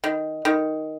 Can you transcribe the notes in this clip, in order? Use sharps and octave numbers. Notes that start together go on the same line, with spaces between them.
D#3
D#3